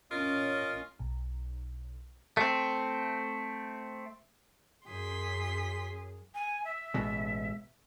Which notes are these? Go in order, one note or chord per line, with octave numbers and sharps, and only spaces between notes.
C#4 F4 A#4 D#5
B1
A3 C4
F#2 G#4 C6 B6
G#5
E5
A1 B2 G#3